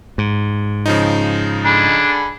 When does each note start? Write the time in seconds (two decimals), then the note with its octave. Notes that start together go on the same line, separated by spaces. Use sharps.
0.18 G#2
0.86 C#3 F3 D#4
1.65 D3 D4 G#4 B5